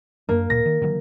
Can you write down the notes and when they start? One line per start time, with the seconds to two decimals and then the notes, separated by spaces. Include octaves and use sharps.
0.29 F#2 A#3 D4
0.50 D1 A#2 A#6
0.66 D#3
0.82 D3 D#3 F#3